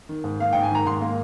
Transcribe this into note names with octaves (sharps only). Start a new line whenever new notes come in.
D#3
G#2
A#3 F5
G#2 G5
G#5
D#3 A#5
G#2 C6
A#3